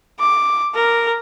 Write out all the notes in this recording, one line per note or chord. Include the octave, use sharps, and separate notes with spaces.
D6
A#4